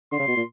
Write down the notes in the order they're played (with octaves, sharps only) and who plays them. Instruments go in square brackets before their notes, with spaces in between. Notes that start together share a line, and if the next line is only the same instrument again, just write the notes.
[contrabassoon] D3 [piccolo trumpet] C6
[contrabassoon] C#3
B2
A#2